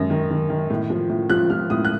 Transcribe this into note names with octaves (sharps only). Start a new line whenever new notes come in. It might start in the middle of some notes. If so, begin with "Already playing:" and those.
Already playing: F#2 D#3 A#6
D#3
D#3
D#3
A2
F3
A2
F3 F#6
F3 F6
A2 D#6
F#6